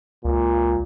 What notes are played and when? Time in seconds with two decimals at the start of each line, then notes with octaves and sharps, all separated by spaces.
0.25 C#2 A#2